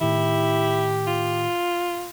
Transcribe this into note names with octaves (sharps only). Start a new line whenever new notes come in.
A2 D#3 E4 G4
F4